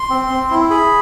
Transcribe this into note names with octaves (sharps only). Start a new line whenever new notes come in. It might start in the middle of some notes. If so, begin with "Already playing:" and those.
Already playing: C6
C4
C4
E4
G#4 B5